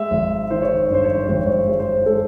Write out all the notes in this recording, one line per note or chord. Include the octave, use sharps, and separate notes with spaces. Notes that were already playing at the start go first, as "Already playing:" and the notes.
Already playing: G#3 E5
G#1
D#3 C5
C#5
C5
C#5
G2 C5
C#5
C5
G#1 C#5
C5
C#5
C5
G#3 C#5
C5
G#3 A4